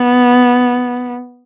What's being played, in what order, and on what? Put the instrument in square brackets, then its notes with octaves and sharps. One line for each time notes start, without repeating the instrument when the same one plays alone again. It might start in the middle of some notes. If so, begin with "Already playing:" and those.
Already playing: [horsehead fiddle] B3